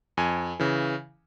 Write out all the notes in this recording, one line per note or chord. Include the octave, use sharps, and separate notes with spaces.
F2 G#5
C#3 E3